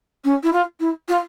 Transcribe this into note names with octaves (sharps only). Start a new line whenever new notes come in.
C#4
E4
F4
E4
F4